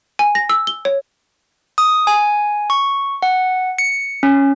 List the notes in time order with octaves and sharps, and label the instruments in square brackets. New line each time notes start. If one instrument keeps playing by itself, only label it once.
[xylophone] G#5
A#6
E6
G7
C#5
[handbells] D#6
G#5
C#6
F#5
C#7
C#4